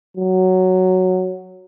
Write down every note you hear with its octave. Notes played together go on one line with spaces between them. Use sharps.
F#3